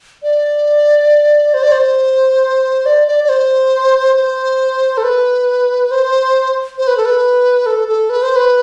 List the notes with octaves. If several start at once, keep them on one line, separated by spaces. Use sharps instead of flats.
D5
C5
D5
C5
D5
D5
D5
C5
C5
A4
B4
C5
C5
B4
A4
B4
A4
A4
B4
C5
B4